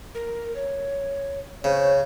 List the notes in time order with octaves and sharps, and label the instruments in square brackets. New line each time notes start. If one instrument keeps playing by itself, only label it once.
[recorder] A#4
C#5
[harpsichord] C#3 [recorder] C5 [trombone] C#5